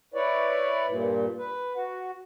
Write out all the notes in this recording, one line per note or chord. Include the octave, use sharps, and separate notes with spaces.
E4 B4 C#5 D5
G2 A#2
B4
F#4